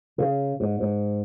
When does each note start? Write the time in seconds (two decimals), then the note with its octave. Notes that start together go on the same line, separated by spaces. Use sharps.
0.18 C#3
0.60 G#2
0.80 G#2